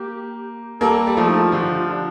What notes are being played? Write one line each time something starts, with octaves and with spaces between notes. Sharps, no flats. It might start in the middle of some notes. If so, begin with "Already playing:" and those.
Already playing: A#3 G4
G3 A#3 A4
G3
F3 A3 A4
D#4
F4
D3 F3 G4
F4
D4